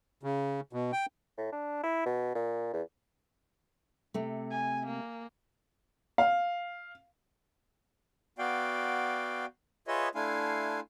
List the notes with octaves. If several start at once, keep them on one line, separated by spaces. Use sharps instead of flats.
C#3
B2
G5
A2
D4
E4
B2
A#2
E2
C3 A3
G#5
A#3
F5
B3 F#4 D5 F5 G5
F4 G#4 B4 C#5 D#5 E5
A3 D4 E4 F5 G#5 C6